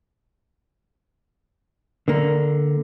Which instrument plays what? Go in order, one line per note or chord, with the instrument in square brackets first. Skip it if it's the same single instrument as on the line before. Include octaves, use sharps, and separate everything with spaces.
[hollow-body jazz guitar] D3 A#3